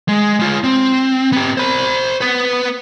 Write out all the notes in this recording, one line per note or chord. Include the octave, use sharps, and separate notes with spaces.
G#3
G#3 F4
C4
B3 G4
C5 B5
B3 B4